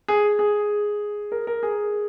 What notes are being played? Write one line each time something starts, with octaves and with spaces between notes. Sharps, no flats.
G#4
G#4
A#4
A#4
G#4